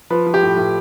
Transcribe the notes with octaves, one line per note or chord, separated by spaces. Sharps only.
F3 B4
F3
G4
A2
A2